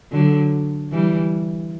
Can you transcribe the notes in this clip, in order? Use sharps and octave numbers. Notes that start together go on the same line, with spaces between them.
D3 F#3
E3 G3